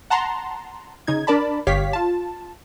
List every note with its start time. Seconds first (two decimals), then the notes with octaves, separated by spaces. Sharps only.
0.10 F#5 A5 A#5 C6
1.07 C#3 D#4 G#6
1.27 D4 A#4 D5 A5 B5
1.67 G1 G4 C#5 F5 B6
1.93 F4 A5